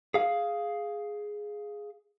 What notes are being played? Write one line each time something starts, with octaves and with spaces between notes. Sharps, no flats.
G#4 F5